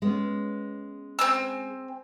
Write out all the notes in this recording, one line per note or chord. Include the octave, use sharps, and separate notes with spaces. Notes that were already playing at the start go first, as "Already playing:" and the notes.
G#3 B3 C#4
C4 G#5 E6